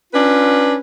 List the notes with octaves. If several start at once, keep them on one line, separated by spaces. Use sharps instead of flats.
C#4 D4 F4 B4